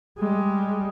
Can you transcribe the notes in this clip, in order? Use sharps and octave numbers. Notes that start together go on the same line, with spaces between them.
G3 G#3